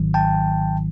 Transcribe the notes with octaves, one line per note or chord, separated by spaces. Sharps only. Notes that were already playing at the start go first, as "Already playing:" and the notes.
Already playing: G#1 G#2 D#3 F#3
G5 A5